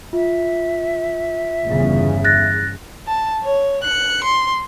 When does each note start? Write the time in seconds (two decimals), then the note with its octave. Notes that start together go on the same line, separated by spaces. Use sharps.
0.13 F4 E5
1.65 G1 E2 C#3
2.24 F#6 A6 A#6
3.07 A5
3.44 C#5
3.83 F#6 C#7
4.24 C6